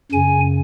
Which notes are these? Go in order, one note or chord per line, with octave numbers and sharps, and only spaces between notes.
F#2 C#3 G#5